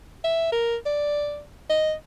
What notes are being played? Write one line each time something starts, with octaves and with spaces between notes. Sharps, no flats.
E5
A#4
D5
D#5